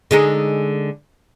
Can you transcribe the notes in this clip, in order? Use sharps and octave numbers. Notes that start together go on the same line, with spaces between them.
D3 G#3 D#4